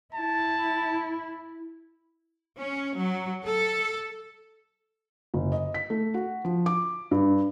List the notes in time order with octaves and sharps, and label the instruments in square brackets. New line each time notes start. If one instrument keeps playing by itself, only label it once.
[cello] E4 [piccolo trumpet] A5
[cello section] C#4
F#3
A4
[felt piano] F#1
D#5
B6
A3
F#4
F3
D6
G2